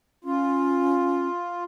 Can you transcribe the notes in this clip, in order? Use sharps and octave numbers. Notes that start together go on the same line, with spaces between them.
C#4 F4